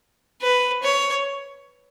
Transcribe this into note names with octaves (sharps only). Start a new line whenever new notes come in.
B4
C#5